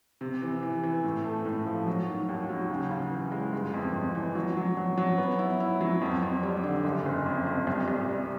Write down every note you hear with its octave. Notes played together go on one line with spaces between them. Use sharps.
C3
E3
E3
E3
A2
A3
A2
F3
F#3
D#3
D#2
F#3
C#3
C#3
E3
G#3
G1
F2
F2
E3
F#3
F#3
F#3
F#3
B3
E4
E4
F#3
F2
F2
G3
D3
F#1
F#1
F2
F2
C2
C2
G3